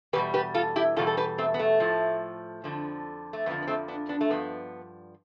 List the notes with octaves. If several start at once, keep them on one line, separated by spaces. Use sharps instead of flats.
E2 B2 G3 G4 B4
G4 B4
F4 A4
E4 G4
E2 B2 G3 F4 A4
A4
G4 B4
A3 C4
B3
A3
A2 F3
F2 D3 F3
A3
F2 D3 F3 B3
B3
A3 C4
B3 D4
B3 D4
A3
G2 F3 B3